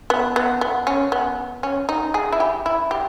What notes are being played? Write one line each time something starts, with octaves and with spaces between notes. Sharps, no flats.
B3
B3
B3
C#4
B3
C#4
D#4
G#4
E4
G4
E4
G4